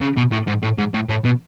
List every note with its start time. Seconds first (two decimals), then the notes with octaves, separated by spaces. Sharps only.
0.01 C#3
0.17 B2
0.32 A2
0.48 G#2
0.63 A2
0.79 G#2
0.94 A2
1.09 A2
1.25 B2